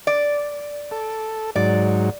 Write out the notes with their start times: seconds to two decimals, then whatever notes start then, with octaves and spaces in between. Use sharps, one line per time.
0.07 D5
0.91 A4
1.56 G#2 F#3 D5